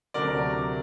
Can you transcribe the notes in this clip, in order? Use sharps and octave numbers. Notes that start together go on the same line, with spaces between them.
D2 C3 F#3 A3 D4 A#4 D5